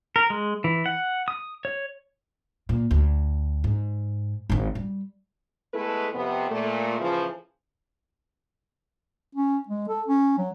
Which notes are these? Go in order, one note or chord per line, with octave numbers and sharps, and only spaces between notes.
A#4
G#3
E3
F#5
D#6
C#5
A#2
D2
G#2
G#1 D#3
G3
G#3 A3 B3 E4 A4 B4
F2 C3 B3
A#2 A3
A2 C#3 E3 F3
C#4
G#3
A4
C#4
F#3